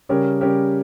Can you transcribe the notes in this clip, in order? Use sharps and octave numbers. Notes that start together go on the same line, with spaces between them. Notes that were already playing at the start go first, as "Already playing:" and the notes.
C#3 G3 C#4 G4 A#4
C#3 G3 C#4 G4 A#4